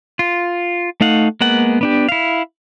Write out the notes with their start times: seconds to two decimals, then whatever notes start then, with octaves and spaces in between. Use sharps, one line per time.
0.19 F4
1.01 A3 D#4 F5 F#5
1.41 G#3 A#3 B3 F#5
1.81 B3 D4 G4
2.09 E4 F5